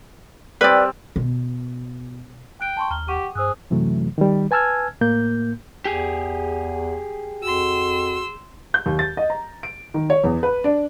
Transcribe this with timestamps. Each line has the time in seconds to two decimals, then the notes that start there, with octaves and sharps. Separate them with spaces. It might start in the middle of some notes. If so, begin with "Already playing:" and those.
0.61 G3 C4 B4 D5
1.16 B2
2.61 G5 F#6 D7
2.77 A5 C6 C#6
2.90 D#2 A#5 F6 G7
3.08 G4 F#5 C#6 D#7
3.35 G2 G#4 C5 E6 F#6
3.70 F#2 C3 E3 F#3 A3
4.18 D#3 G3
4.51 B4 G#5 A5 E6 F6 G#6
5.01 A2 A#3 G6
5.85 E2 G4 G#4
7.42 F2 F#4 C6 E6
8.74 G6
8.86 D#2
8.99 A6
9.17 D#5
9.30 A#5
9.63 D7
9.94 D#3
10.10 C#5
10.24 E2
10.43 B4
10.64 D4